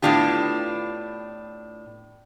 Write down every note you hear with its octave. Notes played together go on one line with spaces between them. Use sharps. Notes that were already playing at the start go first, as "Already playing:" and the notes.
A2 B3 D4 F4 G4